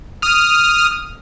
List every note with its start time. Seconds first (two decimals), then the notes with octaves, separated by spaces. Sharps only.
0.22 D#6 F6